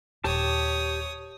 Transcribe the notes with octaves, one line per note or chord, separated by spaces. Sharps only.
D#1 G4 C#5 A5 D#6